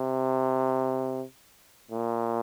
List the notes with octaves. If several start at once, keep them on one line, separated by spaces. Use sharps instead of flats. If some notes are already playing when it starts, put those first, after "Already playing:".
Already playing: C3
A#2